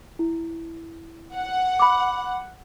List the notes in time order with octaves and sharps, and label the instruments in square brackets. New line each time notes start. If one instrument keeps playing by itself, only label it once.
[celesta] E4
[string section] F#5
[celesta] B5 D6